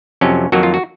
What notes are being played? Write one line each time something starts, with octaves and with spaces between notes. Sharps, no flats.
F2 C3 F#3 C#4
F2 D#3 F#3 A#3 F#4
F4
F#4